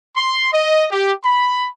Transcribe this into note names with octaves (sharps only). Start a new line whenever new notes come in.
C6
D#5
G4
B5